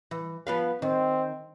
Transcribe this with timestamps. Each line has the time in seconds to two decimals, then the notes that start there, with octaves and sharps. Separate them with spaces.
0.11 E3
0.47 F3 B3 F5
0.82 D#3 C4